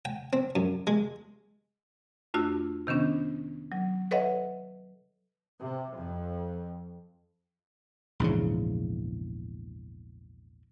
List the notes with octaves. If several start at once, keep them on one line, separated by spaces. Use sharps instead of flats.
G5
C4
F#2
G#3
F2 A3 D4 F4 F#4 E6
C3 D#3 B3 C#4 D4
F#3
A4 B4 C#5 D#5 E5 F#5
C3
F2
A#1 E2 G#2 C#3